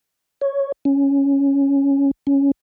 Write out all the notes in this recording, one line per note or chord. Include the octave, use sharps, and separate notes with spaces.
C#5
C#4
C#4